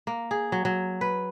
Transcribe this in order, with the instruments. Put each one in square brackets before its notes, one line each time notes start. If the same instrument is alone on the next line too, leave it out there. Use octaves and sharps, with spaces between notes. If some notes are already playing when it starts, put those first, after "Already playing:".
[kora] A#3
G#4
F#3
F#3
B4